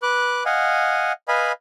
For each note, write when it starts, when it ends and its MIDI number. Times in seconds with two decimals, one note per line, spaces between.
0.03 0.44 71
0.03 0.44 86
0.03 0.44 90
0.46 1.12 75
0.46 1.12 77
0.46 1.12 78
0.46 1.12 80
1.28 1.52 71
1.28 1.52 75
1.28 1.52 77
1.28 1.52 80
1.28 1.52 83